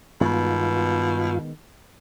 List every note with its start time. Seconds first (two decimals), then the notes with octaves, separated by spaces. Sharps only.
0.21 G2 B2 D#3 G#3 B3 F4